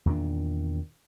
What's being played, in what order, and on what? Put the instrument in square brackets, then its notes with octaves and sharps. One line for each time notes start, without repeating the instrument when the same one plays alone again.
[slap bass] E2 A#2 D#3 D4